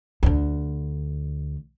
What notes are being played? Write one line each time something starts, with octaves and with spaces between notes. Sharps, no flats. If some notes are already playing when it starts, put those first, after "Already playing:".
D2 D3